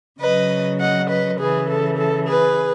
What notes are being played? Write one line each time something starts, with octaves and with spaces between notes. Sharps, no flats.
C#3 F#3 B4 D#5
D#5 F#5
B4 D#5
C#3 E3 G#4 B4
A4
A4
G#4 B4